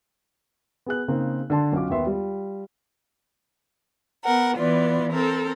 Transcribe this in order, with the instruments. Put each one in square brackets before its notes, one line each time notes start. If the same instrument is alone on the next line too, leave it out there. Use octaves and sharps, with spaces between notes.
[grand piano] B3 G#4 F#6
C#3 A#3 C4 D#4
D3 D4 A5 C6
B1 C#4 F4 F5 D6
D#2 D#3 B3 E5 C6
G3 F4
[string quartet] B3 A#4 F#5
E3 B3 F4 D5
C4 A4 A#4